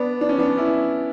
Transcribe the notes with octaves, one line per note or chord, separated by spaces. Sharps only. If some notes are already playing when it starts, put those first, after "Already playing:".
Already playing: B3 D4
D4
C#4
B3 D4
C#4 E4